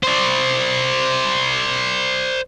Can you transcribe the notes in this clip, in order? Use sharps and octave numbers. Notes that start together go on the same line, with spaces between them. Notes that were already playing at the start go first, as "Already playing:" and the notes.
C5 D5